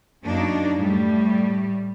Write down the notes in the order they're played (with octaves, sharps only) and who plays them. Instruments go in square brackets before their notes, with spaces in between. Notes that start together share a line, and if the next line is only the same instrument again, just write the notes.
[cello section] F#2 A#3 D4 D#4
A2 G3